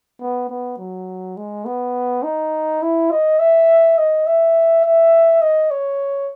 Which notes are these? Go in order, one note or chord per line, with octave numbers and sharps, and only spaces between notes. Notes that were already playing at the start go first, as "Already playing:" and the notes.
B3
B3
F#3
G#3
B3
D#4
E4
D#5
E5
D#5
E5
E5
D#5
C#5